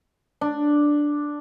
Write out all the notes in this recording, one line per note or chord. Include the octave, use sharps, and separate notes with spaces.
D4